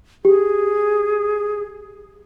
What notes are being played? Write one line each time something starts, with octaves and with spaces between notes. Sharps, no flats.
G4 G#4